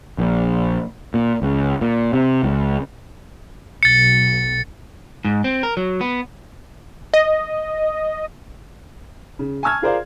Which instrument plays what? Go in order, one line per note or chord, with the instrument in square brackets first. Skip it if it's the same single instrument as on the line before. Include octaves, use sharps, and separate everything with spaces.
[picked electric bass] A#1
A#2
C#2
A#2
C3
C#2
[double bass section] B1 [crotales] A6 C#7
[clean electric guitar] G#2
C4
A#4
F#3
B3
[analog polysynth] D#5
[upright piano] C#3
G#5 A5 C#6 E6 F6 G#6
F4 G#4 A#4 C5 D5 F5